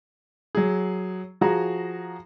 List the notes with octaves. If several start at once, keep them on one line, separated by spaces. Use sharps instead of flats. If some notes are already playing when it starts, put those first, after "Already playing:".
F#3 G#4
F3 F#4 G#4 A#5